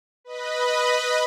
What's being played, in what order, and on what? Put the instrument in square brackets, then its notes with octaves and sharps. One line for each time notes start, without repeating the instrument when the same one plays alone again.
[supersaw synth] B4 D#5 B5